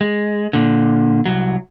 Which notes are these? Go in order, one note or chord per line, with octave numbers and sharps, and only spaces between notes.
G#3
A#2 D3
C2 F#3